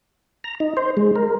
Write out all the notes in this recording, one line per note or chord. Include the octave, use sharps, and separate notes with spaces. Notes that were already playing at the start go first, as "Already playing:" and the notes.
A#5
D#4
C5
G#3
A#4